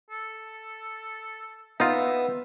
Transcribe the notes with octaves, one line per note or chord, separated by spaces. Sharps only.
A4
B3 D#4 F4 E5